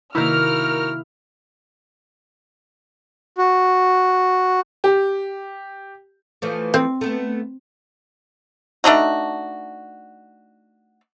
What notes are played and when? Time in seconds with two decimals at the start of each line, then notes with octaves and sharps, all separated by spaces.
0.15 C3 D#3 A#3 D#4 E4 F#4 A#4 F6
3.38 F#4
4.84 G4
6.42 E3 F3 A3
6.74 C4
7.01 A3 B3
8.84 A3 D4 D#4 F#4